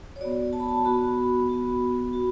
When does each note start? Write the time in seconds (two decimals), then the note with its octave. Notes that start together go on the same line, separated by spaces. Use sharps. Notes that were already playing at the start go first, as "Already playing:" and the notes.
0.16 C#5
0.21 B3 F#4 D5
0.53 A5
0.60 B5
0.68 A5
0.85 B3 F#4 B5
1.49 F#4
1.54 B3
2.13 F#4